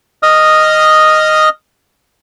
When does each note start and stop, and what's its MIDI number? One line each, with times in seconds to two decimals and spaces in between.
0.23 1.49 75
0.23 1.49 87
0.23 1.49 89